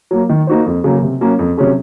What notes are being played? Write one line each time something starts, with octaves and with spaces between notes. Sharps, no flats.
F#3 A#3
D#3
A#3 D#4 F#4 C5
F2
C#3 F#3 A#3
C3
F#3 A#3 C#4
F2
C3 F#3 C#4 G#4